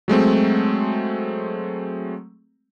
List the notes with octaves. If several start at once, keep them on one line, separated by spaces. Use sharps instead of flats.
F#3 G#3 A3 C4